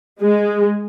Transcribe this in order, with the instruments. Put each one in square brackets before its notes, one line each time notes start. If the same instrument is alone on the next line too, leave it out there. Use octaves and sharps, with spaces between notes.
[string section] G#3